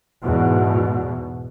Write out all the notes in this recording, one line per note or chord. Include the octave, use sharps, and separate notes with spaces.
E2 G#2 B2